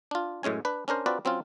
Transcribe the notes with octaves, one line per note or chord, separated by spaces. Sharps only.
D4 F4
F#2 A2 G#3 C#4 G#5
D4 B4
C#4 D4 A#4 C5
C4 D4 F4 F#4 B4 D5
F#3 C4 C#4 F4